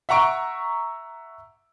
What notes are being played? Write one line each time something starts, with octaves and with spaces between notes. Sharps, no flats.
E5 F#5 A#5 C#6 D7